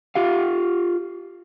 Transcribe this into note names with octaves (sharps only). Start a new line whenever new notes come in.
F4 G4 F5